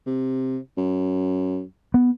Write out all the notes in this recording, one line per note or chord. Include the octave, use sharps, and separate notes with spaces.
C3
F#2
B3